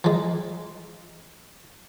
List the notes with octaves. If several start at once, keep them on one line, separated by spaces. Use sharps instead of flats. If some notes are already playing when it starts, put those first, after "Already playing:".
F3 G#3